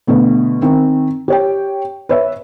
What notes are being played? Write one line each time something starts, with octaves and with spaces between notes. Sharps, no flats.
B2 D3 A3 B3
D#3 C4
G4 C#5 G5
B4 C#5 E5